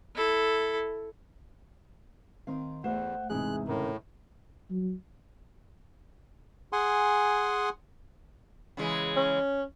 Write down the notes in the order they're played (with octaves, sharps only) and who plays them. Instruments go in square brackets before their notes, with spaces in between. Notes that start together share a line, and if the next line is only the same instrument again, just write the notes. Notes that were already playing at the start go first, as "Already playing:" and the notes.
[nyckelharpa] E4 A4
[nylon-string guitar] D#3 C4 F5
[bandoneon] E2 [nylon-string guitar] A3 [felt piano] C5 [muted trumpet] F#5
[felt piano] E2 G#2 C3 [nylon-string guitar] G#3 C4 E4 [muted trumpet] G#4 [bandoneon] F#6
[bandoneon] A2 [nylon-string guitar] C#3 [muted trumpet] A#4
[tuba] F#3
[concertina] G#4 F#5 G#5 C6
[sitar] C#3 E3 G#3
[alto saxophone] C#4